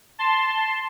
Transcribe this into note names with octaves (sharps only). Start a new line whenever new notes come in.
A5 C6